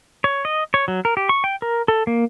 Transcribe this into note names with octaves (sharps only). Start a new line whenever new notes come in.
C#5
D#5
C#5
F#3
A#4
G4
C#6
G5
A#4
A4
A#3